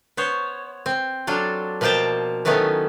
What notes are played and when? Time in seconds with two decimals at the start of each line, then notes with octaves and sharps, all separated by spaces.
0.17 B3 C5 C#5
0.86 C4
1.27 F#3 D4 F4 A4
1.81 B2 F3 A#3 C5 G5 A5
2.45 D#3 E3 F#3 A3 B3 C#4